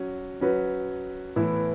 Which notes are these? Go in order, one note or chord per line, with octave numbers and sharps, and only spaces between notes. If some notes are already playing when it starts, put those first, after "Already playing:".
Already playing: F#3 C#4 F#4
F#3 C#4 F#4 B4
A2 E3 B3 E4